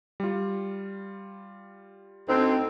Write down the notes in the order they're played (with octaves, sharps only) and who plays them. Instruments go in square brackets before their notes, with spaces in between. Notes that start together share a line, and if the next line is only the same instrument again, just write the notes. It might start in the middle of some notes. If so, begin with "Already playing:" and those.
[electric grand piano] G3 F4
[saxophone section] D2 C4 [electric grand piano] D#4